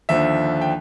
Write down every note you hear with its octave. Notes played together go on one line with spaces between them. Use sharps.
D#2 D3 F3 E5
G5